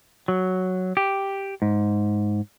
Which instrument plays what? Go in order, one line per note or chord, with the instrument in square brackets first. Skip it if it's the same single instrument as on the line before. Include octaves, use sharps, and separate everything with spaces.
[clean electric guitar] F#3
G4
G#2